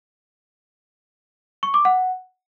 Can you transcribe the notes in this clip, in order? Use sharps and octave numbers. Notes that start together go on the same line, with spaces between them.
C#6
D6
F#5